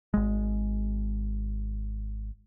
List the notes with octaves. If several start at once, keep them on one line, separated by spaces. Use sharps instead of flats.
G#1 G#3